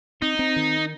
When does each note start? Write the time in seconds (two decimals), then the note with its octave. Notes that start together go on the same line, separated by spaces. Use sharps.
0.22 C4 D#4
0.39 C4
0.56 D#3